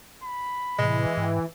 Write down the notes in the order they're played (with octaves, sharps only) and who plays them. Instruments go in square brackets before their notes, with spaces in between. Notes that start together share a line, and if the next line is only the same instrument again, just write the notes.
[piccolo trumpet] B5
[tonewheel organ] A2 C3 [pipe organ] E3 [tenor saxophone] G#3
[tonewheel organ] G#2 G5